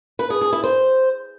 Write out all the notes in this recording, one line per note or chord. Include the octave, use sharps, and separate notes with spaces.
B4
G#4
G#4
E4
C5